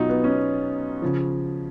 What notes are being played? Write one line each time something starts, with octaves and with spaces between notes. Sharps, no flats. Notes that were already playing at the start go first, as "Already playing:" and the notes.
Already playing: B2 F#3 D#4 F4
B3
C#4
C#3 F3